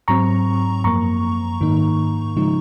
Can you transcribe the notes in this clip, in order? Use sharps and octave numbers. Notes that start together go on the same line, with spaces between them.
G#2 F#3 C4 A#5 C#6
F#2 F3 A#3 A#5 C#6
G#2 D#3 A#3 D#4
C#3 F3 G#3 D#4